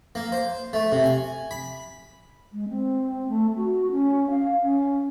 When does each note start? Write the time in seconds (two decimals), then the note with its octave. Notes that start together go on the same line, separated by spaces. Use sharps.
0.15 A#3
0.32 C5
0.73 A3
0.92 C3
1.04 G#5
1.51 B5
2.51 G#3
2.69 C4
3.28 A3
3.56 F#4
3.92 C#4
4.30 F5
4.62 C#4